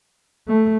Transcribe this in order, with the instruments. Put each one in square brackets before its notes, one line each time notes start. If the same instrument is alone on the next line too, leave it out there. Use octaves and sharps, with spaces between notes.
[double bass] A3